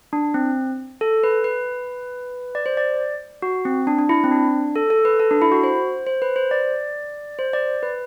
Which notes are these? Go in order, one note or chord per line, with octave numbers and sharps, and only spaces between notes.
D4
C4
A4
B4
B4
D5
C5
D5
F#4
C4
D4
D4
E4
C4
D4
A4
A4
B4
A4
D4
E4
F#4
C5
C5
B4
C5
D5
C5
D5
B4